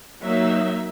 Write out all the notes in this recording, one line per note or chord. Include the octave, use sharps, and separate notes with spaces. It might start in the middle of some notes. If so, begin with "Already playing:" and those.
F#3 A#3 D#4 E5